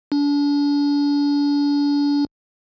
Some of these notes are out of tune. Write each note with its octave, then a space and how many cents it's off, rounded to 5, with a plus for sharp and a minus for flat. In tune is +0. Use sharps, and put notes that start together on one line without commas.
D4 -35